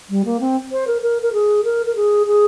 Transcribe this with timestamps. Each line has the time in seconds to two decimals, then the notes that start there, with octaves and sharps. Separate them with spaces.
0.09 G3
0.25 A#3
0.40 C4
0.71 C5
0.87 A#4
1.02 A#4
1.22 A#4
1.33 G#4
1.64 A#4
1.86 A#4
1.95 G#4
2.26 G#4